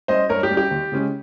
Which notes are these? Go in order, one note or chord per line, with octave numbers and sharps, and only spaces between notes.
G3 C#4 C5 D#5
G2 A#4 C#5
G4
G3 C#4
G4
D#2
C#3 G#3 C#4